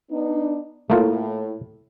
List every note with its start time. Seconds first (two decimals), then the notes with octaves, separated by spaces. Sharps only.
0.11 B3 D4 D#4
0.90 A2 A3 A#3 F4